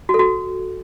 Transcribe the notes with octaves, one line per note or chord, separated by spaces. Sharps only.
F#4
A4
F#4